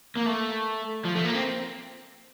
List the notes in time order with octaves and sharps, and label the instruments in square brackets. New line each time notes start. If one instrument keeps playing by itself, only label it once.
[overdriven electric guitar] A#3
A3
F3
A3
A#3
C4